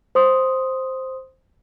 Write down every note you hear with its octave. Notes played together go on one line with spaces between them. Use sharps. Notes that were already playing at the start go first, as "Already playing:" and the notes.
C5 C6 D#6